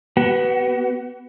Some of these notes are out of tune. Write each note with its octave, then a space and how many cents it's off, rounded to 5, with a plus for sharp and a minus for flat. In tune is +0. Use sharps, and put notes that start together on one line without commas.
B3 +0 F#4 +45